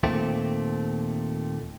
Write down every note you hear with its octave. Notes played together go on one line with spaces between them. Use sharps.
D#2 A#2 A3 C4